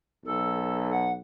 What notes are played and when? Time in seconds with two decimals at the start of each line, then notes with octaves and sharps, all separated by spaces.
0.25 B1 A4
0.90 F#5